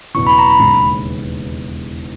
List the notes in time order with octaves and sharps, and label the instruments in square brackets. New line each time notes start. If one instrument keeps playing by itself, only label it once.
[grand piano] F#1 E2 B2 [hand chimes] C#6
[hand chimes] B5
A#5
B5
[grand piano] E1 D#2 C#3